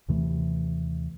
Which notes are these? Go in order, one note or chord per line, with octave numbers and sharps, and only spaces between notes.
D#2 C3 E3 A3